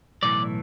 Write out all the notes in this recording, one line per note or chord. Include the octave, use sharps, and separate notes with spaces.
B1 A2 E3 D5